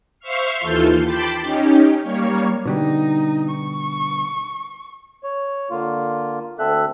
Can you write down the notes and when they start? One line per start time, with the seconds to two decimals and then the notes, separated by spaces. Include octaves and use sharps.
0.19 C5 E5 F5 C#6 F6 C7
0.58 D#2 E3 F4 A4 G6
1.02 G5 A5 B5 C6 D6 G6
1.40 C#4 D#4 G4
2.01 G3 A#3 C#5
2.65 B2 D3 G3 D#4
3.53 C#6
5.24 C#5
5.71 D3 A#3 F4
6.59 D2 D3 C4 A4 E5 F#6